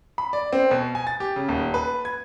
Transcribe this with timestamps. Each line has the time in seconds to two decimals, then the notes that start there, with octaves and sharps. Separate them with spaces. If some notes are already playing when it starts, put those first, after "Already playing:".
0.18 B5
0.33 D5
0.53 C4
0.71 B2
0.95 G#5
1.07 A6
1.20 G4
1.36 C#3
1.48 D#1
1.74 B4
2.05 G#6